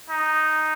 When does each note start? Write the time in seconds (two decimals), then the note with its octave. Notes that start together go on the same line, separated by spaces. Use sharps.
0.10 D#4